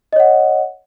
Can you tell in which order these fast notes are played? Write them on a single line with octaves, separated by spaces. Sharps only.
D#5 C#5 F#5